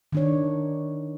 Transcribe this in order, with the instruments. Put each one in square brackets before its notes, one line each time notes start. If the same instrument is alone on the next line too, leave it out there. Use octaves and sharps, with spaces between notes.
[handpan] D#3 D4 C#5